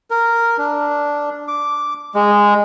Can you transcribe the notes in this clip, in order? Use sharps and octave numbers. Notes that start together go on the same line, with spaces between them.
A#4
D4
D6
G#3